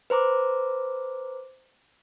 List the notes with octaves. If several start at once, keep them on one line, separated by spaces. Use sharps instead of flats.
B4 C5 A#5 D6